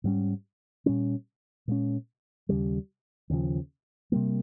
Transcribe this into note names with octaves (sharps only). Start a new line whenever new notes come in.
G#2 G3 C#4
A#2 G3 C#4
A#2 G#3 C#4
D#2 C#3 G3
D#2 C#3 F3
C3 G3 A#3